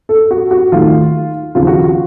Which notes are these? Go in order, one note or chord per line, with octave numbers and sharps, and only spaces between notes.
A4
F#4
F#4
D#2 D#3 A3 F4
D#2 C#3 F3 F4
F#4
F4